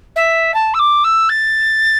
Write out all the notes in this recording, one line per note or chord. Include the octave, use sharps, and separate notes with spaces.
E5
A5
E6
D6
E6
A6